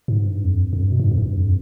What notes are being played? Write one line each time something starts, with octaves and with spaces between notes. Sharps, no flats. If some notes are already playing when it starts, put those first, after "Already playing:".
G#2
G2
F2
F2
G2
B2
G#2
F2
G2
F2